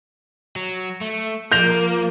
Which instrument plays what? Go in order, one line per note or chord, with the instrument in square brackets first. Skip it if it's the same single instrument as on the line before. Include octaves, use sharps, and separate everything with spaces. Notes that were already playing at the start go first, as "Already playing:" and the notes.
[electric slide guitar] F#3
A3
[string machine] F3 A#4 [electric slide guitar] A#3 [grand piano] G6 A#6 F7